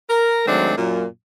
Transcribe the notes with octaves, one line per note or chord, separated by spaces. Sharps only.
A#4
D#3 F#3 G#3 A3 C4 D4
F#2 A#2